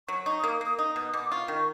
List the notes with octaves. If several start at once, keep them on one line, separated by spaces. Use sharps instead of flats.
F#3 C#6
D#4 C#6
D#6
A#3
A#3 D#6
D#4 D#6
B2 D#6
B2 D6
F4 C#6
D#3